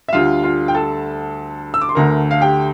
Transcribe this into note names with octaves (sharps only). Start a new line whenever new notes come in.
E5
D2 D3 G3 F4 F5
F4 F5
G5
A4 A5
E6
D6
C6
D2 D3 A3 A#4 A#5
F5
G4 G5